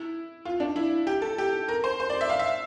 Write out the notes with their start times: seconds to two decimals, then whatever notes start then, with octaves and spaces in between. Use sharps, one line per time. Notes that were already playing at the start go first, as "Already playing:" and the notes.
Already playing: E4
0.45 F4
0.60 D4
0.76 E4
1.07 G4
1.22 A4
1.38 G4
1.68 A#4
1.84 C5
2.00 C5
2.10 D5
2.21 E5
2.30 F5
2.39 E5